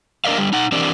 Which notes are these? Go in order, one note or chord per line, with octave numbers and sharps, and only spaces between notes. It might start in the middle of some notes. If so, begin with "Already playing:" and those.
D4 A#4 D5 D#5 F5
D3 G3
D#4 F#5
E3 C4 D4 G4 A#4 D5